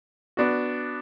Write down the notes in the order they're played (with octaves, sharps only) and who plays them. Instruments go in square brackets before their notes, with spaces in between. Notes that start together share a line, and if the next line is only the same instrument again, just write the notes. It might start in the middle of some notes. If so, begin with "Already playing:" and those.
[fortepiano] B3 D4 F#4